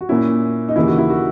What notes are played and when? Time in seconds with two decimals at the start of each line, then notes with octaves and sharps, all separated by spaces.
0.01 F#4
0.09 A#2 A#3 C#4 E4
0.69 D#4
0.76 D#2 C#3 E3 A#3 E4
0.87 F#4
0.98 E4
1.10 F#4